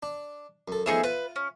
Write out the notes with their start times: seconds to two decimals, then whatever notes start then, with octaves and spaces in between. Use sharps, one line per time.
0.03 D4
0.68 F#2 A4
0.86 F3 A3 B3 D#4 G#4 E5
1.04 F4 B4
1.36 C#4